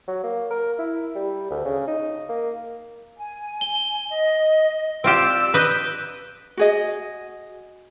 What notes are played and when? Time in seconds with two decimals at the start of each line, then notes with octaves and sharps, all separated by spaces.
0.08 F#3
0.23 A#3
0.51 A#4
0.78 E4
1.15 G3
1.50 D2
1.65 C#3
1.87 D#4
2.29 A#3
3.18 G#5
3.61 G7
4.09 D#5
5.04 C4 F4 G4 D5 E6 D7 E7
5.54 B4 D#5 G6
6.57 F#4 G#4 D#5